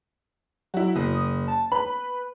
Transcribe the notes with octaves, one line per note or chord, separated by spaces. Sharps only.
F#3 E4 F#4
F#1 D#6
A5
B4 B5